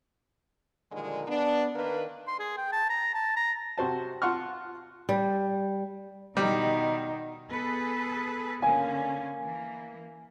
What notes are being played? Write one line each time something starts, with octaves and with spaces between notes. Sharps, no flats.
A#2 D3 D#3 F3 G3 G#3
B3 D4
D#3 A#3 B4
C6
G#4
G5
A5
A#5
A5
A#5
C3 F#4 C5 A5
F4 F#5 A5 C6 C#6 F6
G3
B2 D#3 G3
B3 G#4 A4 B4 C#7
D3 A#3 C#4 A#4 F5 G#5
E3 A#3